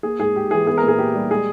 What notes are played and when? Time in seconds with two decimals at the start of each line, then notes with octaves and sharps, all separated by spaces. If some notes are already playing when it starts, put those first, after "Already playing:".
0.03 A#3 G#4
0.19 G#2 G#4
0.35 G#2 G4
0.51 E3 G#4
0.66 B3 G#4
0.78 A#4
0.83 A#2 G#4
0.99 A#2 G4
1.14 G3
1.31 G#3 G#4